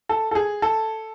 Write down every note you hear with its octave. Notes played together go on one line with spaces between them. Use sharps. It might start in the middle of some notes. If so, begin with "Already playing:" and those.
A4
A4
G#4
A4